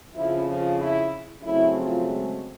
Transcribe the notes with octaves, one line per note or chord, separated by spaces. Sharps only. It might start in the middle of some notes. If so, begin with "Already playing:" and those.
F2 C#3 F3 E4
F3 F4
E4
C#3 F#3 A3 C4 E4
F3 F4
G#3 G#4